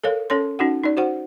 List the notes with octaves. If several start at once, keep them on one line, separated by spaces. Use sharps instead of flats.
A4 A#4 C#5 F5
C#4 A4 C#5 C6
C#4 D#4 F#4 F#5
D#4 D5
F#4 C5 F#5